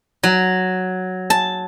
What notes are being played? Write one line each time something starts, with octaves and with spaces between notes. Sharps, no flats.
F#3
A5